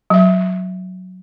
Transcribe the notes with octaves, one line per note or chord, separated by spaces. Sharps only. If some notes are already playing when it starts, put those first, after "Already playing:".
F#3 E5